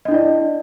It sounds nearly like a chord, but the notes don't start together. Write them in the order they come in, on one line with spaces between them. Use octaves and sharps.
D#5 D4 E4 D5